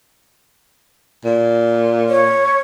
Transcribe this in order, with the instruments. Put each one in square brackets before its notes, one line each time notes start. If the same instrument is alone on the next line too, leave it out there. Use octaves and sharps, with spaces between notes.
[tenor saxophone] A#2
[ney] C#5